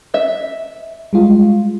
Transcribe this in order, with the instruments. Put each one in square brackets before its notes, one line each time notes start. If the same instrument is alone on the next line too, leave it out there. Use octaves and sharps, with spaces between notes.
[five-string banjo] D#5 E5
[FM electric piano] G3 G#3 F4